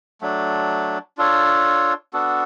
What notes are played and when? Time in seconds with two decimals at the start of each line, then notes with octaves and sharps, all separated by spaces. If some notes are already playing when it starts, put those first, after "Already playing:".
0.21 F#3 A3 D4
1.17 D4 F4 A4 C#5
2.14 B3 D4 F#4 A4